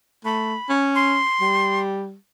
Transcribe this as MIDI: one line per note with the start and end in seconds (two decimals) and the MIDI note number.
0.25 0.55 57
0.25 0.73 83
0.69 1.22 61
0.95 1.79 84
1.41 2.15 55